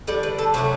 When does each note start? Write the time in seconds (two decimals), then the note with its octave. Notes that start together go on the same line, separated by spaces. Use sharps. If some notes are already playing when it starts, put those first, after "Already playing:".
0.07 D3 G3 D5
0.23 B4
0.38 A4
0.54 C3 F#3 A3 F#4